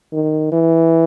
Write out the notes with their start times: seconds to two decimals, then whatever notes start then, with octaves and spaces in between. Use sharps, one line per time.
0.13 D#3
0.52 E3